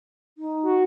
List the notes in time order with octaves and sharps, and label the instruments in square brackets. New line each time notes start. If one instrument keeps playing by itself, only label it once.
[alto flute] D#4
[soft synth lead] F#4